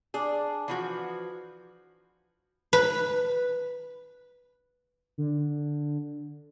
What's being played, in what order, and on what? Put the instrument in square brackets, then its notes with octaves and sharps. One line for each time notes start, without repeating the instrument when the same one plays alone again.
[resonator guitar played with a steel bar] D4 G#4
E3 F3 F#4
[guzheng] B4
[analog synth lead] D3